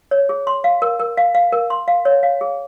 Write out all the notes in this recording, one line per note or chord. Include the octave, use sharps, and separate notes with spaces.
C#5
G#4
C6
F5
A#4
A#4
F5
F5
A#4
C6
F5
C#5
F5
G#4